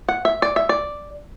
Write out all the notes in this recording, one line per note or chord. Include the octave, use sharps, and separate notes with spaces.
F#5
E5
D5
E5
D5